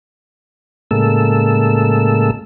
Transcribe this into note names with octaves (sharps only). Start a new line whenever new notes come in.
A2 C#3 G#3 A#3 A4 E6